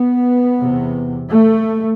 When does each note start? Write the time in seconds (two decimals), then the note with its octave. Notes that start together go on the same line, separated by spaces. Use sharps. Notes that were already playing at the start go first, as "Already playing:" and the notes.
Already playing: B3
0.58 E2 C3
1.31 A3